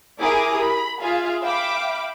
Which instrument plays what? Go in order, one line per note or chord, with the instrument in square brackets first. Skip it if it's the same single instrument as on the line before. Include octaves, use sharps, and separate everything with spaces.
[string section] E4 G4 G#4 A#4 D6 D#6
B5
F4 G#4 E5 F5
E5 F5 G5 B5 D6